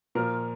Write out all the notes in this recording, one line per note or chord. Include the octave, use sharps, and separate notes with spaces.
A#2 F3 A#4